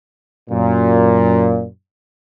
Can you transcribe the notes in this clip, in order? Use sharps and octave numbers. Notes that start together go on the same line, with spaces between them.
F#2 A#2